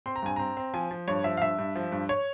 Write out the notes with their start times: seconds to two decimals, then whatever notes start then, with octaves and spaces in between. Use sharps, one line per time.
0.06 C4 C6
0.16 A#5
0.23 G2 G#5
0.36 C4 A#5
0.57 C4
0.74 F3 G#5
0.91 F3
1.08 G2 C#5
1.24 F3 E5
1.37 F5
1.42 G2 E5
1.59 G2
1.75 F3
1.92 G2
2.09 C#5